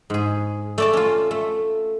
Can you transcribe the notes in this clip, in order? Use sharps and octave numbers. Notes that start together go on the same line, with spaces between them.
G#2 G#4
A3 D5 A5
C#4 F4
A3